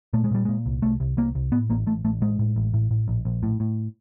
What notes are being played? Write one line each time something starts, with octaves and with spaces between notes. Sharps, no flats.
A#2 A3
G#3
A#2 G3
A#2 G#3
C2
C2 A3
C2
C2 A#3
C2
A2 B3
A1 A#3
A1 A3
A1 A3
A2 G#3
A2
A1
A2
A2
A#1
A#1
A2
A2